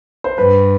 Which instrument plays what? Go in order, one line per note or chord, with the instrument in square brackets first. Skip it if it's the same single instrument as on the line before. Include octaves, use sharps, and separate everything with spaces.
[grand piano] C5
[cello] G2 [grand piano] B4